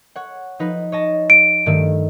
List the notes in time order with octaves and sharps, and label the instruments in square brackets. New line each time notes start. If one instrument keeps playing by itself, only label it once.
[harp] C#5 F#5
F3 D#4 B4
C#5 D#5 A5
[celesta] D7
[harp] G2 D#3 A3